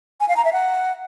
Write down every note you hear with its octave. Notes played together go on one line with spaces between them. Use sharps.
G#5
F5
A#5
E5
F#5